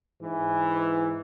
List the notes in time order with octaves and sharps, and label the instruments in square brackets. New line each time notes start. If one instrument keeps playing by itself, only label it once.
[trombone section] G#2 E3